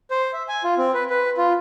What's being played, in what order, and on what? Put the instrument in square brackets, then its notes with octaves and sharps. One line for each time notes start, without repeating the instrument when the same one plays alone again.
[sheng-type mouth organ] C5
E5
G#5
F4
C4
B4
B4
F4